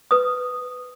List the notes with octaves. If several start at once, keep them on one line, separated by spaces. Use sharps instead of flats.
B4 D#6